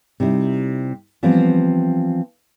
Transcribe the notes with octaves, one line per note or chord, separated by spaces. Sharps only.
C3 G3 D#4 E4
E3 F3 G3 B3 C4